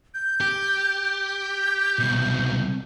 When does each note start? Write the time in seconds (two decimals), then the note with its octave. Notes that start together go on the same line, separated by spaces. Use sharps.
0.14 G6
0.41 G4
1.26 G6
1.99 C2 B2